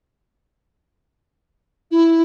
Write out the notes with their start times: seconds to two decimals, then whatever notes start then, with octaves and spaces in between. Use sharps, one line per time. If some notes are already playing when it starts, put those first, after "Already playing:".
1.91 E4